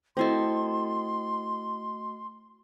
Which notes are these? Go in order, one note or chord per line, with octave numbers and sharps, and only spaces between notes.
A3 C4 E4 F#4 A4 D#5 C6